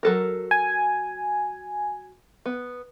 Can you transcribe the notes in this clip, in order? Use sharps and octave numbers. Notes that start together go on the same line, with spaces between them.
F#3 A4 A#4
G#5
B3